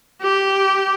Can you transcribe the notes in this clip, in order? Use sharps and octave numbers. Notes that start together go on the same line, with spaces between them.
G4